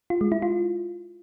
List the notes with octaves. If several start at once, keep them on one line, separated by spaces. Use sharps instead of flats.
F4
G#3
E4
F4